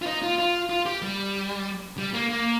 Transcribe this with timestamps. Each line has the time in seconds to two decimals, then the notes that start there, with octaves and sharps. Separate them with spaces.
0.02 F4
0.06 D#4
0.23 F4
0.38 F4
0.70 F4
0.86 G4
1.02 G3
1.98 G3
2.14 A#3
2.29 A#3